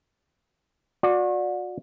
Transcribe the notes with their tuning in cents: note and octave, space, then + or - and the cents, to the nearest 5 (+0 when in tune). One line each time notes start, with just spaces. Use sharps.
F#4 -35 D5 +0